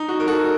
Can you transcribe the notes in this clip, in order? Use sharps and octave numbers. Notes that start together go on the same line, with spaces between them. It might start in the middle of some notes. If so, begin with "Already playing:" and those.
Already playing: D#4
F#4
A#4
F#4 A4